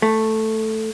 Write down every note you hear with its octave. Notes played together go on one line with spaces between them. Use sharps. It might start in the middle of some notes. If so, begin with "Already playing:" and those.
A3